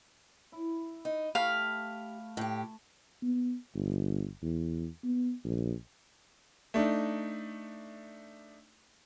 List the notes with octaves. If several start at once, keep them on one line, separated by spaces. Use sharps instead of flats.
E4
D#4
A3 G4 F5 B5
A2 G4
B3
G1
E2
B3
A#1
A3 D4 D#4